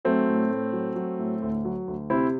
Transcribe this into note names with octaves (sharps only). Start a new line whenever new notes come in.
F#3 A3 C4
A2
A2
F#3
F#3
A2
D2
F#3
D2
C3 C4 E4